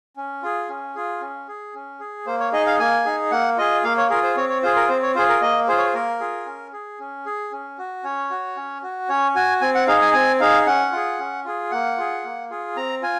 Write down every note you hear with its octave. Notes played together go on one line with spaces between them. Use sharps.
C#4
F4 G#4
C#4
F4 G#4
C#4
G#4
C#4
G#4
A#3 C5
C#5
D#4 G#4 D#5
F5
A#3 G#5
D#4 G#4
A#3 F#5
F4 G#4 D#5
A#3 F5
C#5
F4 G#4 A#4
C5
C4 C#5
C#5
F4 G#4 C5
A#4
C4 C5
C#5
F4 G#4 C5
A#4
A#3 D#5
F4 G#4 C5
C#5
C5
A#3 A#4
F4 G#4
C#4
G#4
C#4
G#4
C#4
F#4
C#4 C#5
F#4
C#4
F#4
C#4 C#5
F#4 G#5
C4 G#5
F#5
D#4 G#4 F5
G#5
C4 G#5
D#4 G#4 F5
C#4 F#5
F4 G#4
C#4
F4 G#4
A#3 F#5
F4 G#4
A#3
F4 G#4
C4 A#5
F4 G#5